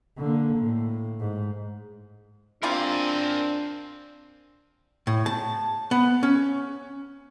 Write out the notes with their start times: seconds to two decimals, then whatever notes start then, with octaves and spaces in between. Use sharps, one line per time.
0.18 D3 A#3
0.58 A2
1.20 G#2
2.63 G3 A#3 C4 D4 F4 A#4 G#5
5.07 A2
5.26 A5
5.91 B3
6.23 C#4